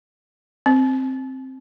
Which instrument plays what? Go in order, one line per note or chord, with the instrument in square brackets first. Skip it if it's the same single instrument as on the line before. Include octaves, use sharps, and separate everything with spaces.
[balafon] C4